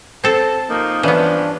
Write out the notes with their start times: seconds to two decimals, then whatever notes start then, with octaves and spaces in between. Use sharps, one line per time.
0.24 C4 A4 A5
0.69 C3 F3 A#3 D#4
1.03 G2 E3 F3 B3 C#4 D4